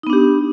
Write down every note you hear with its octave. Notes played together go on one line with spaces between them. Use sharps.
B3 D4 D#4 G4